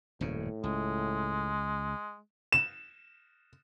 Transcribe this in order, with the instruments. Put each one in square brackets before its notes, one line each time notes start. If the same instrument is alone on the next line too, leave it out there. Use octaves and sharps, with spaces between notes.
[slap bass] D#1 F#2 C#3 [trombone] A2
[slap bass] C#2 [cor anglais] G#3
[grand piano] E7